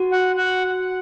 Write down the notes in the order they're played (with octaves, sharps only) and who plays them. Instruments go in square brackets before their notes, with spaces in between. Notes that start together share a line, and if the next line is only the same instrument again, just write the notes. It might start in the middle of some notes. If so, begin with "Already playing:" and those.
Already playing: [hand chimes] F#4
[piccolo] F#5
F#5